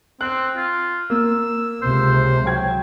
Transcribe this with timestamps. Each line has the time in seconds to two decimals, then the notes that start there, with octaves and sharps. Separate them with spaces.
0.21 C4 F#6
0.56 F4
1.10 A#3 E6
1.82 C#2 C3 C5
2.46 F#3 G5 G#6